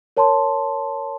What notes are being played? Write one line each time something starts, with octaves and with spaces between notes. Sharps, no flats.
A#4 C#5 A5 C6